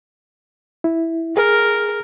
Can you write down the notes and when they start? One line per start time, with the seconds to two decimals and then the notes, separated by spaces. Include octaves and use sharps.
0.84 E4
1.37 G#4 A#4